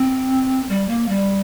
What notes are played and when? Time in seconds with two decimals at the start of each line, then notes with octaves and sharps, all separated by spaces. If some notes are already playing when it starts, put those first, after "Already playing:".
Already playing: C4
0.69 G3
0.88 A#3
1.09 G3